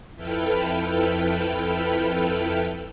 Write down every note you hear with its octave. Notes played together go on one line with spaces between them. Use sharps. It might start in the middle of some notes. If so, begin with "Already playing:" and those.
F2 E4 A4 B4 G5 F6